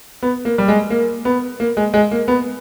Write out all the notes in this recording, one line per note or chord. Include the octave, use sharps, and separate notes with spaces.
B3
A#3
G3
G#3
A#3
B3
A#3
G#3
G#3
A#3
B3